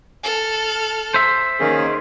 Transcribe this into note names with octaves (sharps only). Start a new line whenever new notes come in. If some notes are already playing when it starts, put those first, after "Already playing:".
A4 F6
C5 E5
D#3 A#3 C#4 G#4